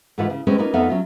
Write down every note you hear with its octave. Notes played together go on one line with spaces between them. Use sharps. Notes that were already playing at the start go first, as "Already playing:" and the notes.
G#2 D3 E3 F4 B4 F#5
C#3
D2 G#3 C4 C#4 F#4 B4
A#3 C#4 D#4 F4 B4
F2 B3 D#4 A4 E5 F5
F#3 C#4 F4